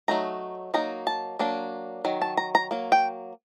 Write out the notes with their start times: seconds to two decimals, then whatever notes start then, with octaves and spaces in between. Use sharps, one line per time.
0.08 F#3 A3 D#4 A#5
0.74 F#3 A#3 D#4 A#5
1.07 A5
1.39 F#3 A#3 D4
2.05 D#3 F#3
2.22 A5
2.37 A#5
2.55 A#5
2.71 F#3 A#3
2.92 G5